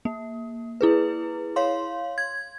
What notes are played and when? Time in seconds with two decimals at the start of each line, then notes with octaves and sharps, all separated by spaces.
0.05 A#3
0.81 E4 G#4 B4
1.56 C#5 F5 C6
2.18 G#6